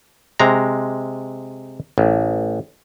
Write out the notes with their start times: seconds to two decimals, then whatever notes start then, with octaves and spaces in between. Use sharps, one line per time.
0.40 C3 G#3 A#5
1.98 A1